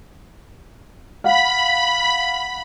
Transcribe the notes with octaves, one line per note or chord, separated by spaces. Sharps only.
F5 F#5 B5